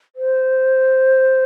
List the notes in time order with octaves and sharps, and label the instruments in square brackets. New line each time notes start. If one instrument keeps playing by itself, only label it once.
[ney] C5